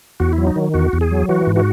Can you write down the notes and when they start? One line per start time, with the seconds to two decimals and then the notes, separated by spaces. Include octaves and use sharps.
0.20 E2 F#4
0.33 E4
0.38 F#3
0.47 D#4
0.56 D#3
0.74 E2 F#4
0.93 E2
1.01 G#4
1.11 F#3
1.29 E3 F#4
1.47 G#2
1.56 F#4